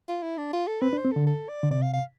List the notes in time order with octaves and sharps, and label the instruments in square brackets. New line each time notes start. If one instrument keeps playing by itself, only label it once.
[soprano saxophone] F4
E4
D4
F4
A4
[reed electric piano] C4 [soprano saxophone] B4
[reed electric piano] D4
[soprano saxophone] C5
[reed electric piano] C4
[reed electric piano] D3 [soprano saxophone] A4
[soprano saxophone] A4
D5
[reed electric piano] D3
[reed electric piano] C3 [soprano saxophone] D5
[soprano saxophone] F5
F5